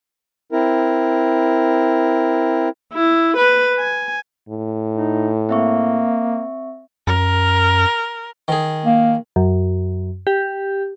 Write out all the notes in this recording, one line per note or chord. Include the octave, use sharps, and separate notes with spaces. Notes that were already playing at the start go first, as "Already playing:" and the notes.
C4 E4 A#4
E4
B4
G#5
A2
D#4
A#3 C4 E5 C#6
F#2 A#4
D#3 G#4
A#3
F#2
G4